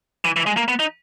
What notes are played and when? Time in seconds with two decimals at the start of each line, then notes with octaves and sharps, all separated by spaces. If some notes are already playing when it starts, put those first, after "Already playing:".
0.25 E3
0.36 E3
0.46 G#3
0.57 A#3
0.68 B3
0.80 D#4